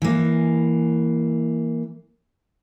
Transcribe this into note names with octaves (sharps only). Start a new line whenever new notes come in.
E3 A#3